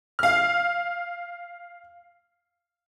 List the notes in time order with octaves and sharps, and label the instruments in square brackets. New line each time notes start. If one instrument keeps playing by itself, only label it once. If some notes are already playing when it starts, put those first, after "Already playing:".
[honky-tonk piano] F5 F6